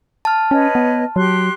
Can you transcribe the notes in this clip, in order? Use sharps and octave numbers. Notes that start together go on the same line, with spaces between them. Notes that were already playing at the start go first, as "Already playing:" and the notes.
A5 F6
C#4 B4 C#5 D#5
B3
F#3 G4 C6 F#6